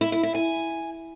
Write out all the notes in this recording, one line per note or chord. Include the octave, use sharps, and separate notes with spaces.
E4
E4
E4
G#5